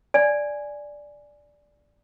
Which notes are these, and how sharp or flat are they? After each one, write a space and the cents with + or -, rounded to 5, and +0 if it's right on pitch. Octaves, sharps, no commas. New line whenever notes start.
D5 +0 G#5 +0